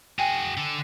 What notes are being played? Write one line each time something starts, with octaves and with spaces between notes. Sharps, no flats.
F#4 G#4 G5 G#5
D3 A4